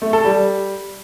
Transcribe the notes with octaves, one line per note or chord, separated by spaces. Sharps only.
A3
A4
G3